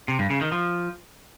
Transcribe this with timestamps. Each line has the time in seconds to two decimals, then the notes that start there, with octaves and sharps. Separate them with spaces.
0.08 C3
0.19 G2
0.30 C#3
0.41 D#3
0.52 F3